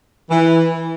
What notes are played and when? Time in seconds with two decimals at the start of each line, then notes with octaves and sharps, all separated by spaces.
0.29 E3